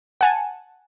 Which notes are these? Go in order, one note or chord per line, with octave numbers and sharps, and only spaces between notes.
F#5 G#5 A5